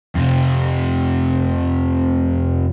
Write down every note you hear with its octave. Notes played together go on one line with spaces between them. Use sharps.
F2 C3